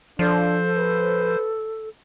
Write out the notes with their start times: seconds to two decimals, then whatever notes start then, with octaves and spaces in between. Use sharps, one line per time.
0.19 F3 D4 A4 C5
0.76 B4